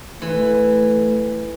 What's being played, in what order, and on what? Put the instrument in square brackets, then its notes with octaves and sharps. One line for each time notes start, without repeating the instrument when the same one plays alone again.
[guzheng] E3 [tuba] A3